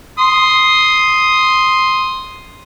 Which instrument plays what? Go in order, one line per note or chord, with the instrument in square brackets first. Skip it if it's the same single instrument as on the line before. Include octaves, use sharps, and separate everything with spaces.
[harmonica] C6 D#6